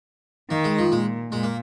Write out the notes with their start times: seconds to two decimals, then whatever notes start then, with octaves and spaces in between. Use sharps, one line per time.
0.50 D#3 A#3
0.64 G#3
0.79 F3
0.91 A#2 G#3
1.31 A#2 G#3
1.43 A#3